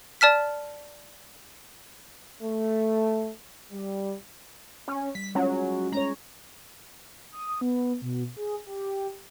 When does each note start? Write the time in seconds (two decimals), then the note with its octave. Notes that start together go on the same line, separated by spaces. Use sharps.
0.21 D5 A5 F6 B6
2.43 A3
3.71 G3
4.88 C#4
5.15 G3 B6
5.35 F#3 G#3 C#4 F4
5.93 G#3 C#4 C#5 A#5
7.32 D#6
7.61 B3
8.02 B2
8.37 G#4
8.66 G4